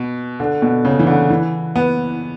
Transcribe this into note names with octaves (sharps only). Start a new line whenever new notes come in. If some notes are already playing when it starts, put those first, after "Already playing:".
Already playing: B2
D3
B2
C#3
E3
D3
E3
B3